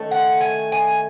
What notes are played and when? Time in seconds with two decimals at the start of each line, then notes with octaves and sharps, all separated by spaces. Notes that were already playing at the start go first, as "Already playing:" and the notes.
Already playing: D#3 A3 C#4
0.11 F#5
0.41 G#5
0.72 G#5